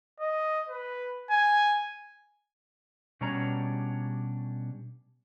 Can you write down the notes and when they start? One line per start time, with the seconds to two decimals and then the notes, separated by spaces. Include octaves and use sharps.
0.20 D#5
0.69 B4
1.31 G#5
3.21 B2 G3 C#4 D4 C#5 A#5